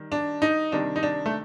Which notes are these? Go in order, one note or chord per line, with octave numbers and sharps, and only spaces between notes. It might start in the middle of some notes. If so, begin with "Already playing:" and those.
Already playing: D#3 G3
D4
D#4
C3 D#3 G3 D4
D#4
D4
A3